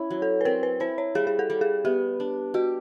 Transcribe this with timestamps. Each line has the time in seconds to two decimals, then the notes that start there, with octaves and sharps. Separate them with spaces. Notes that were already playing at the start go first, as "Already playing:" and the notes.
Already playing: C#4 E4
0.10 F#3
0.22 A4
0.41 B4
0.45 C4 A#4
0.63 B4
0.80 E4 C5
0.98 C#5
1.15 G3 G#4
1.27 G#4
1.39 A4
1.50 G3
1.61 G#4
1.85 B3 G4
2.20 D4
2.54 F#4 G4